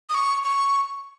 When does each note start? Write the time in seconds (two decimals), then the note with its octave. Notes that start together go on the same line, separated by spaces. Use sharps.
0.09 D#6
0.14 C#6
0.43 C#6